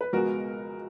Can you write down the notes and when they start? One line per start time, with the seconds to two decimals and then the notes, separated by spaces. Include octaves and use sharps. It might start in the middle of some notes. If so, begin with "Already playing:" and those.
0.01 B4
0.13 C#2 B2 G#3 B3 F#4 A#4